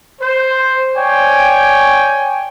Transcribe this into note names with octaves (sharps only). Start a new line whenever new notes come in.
C5
C#5 D5 G5 G#5